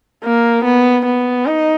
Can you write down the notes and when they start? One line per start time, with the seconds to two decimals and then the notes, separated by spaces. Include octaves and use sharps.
0.24 A#3
0.65 B3
1.05 B3
1.46 D#4